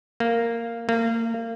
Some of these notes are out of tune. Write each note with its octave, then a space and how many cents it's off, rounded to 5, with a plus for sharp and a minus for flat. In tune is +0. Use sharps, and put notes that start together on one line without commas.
A#3 -10
A#3 -30